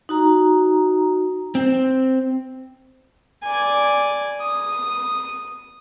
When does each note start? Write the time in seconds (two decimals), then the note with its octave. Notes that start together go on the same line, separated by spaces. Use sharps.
0.09 D#4 F#4 A#5
1.55 C4
3.44 D5 G#5
4.41 D#6